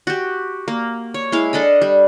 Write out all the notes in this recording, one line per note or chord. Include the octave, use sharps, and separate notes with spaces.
F#4 G4
A#3
C#5
G#3 E4 F5
D4 A4 D#5 B5
G3